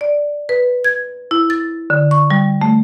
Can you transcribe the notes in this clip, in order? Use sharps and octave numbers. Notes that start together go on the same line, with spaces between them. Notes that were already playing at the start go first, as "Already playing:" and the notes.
D5
B4
G#6
E4
A6
D3
C#6
G3
A3